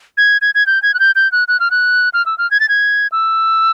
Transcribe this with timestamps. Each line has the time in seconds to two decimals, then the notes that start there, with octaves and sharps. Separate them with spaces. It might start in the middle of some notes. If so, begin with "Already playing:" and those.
0.17 G#6
0.42 G#6
0.55 G#6
0.67 G6
0.83 G#6
0.94 F#6
1.00 G6
1.16 G6
1.32 F#6
1.48 F#6
1.60 F6
1.71 F#6
2.14 F6
2.26 E6
2.38 F6
2.51 G#6
2.60 A6
2.69 G#6
3.12 E6